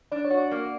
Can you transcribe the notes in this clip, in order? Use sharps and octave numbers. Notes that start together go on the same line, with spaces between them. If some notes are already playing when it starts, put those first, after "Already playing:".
D4 D5
C#5
F#4
D5
A#3